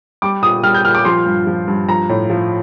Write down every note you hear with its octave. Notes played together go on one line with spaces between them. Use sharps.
G3 D6
A#2 D#6
G3 F6
G6
A#2 F6
D6
F3 C6
G2
F3
G2
F3 A#5
A2
F3